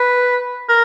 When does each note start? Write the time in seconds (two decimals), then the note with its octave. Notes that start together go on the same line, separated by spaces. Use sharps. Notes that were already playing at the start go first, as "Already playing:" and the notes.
Already playing: B4
0.69 A#4